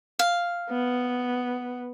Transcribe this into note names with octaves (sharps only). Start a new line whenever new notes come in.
F5
B3